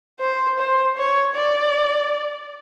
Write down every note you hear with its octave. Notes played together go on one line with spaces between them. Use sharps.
C5
C5
C#5
D5